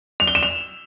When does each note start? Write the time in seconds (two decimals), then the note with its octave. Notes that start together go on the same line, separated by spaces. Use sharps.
0.20 F7
0.27 G7
0.35 E7
0.43 F7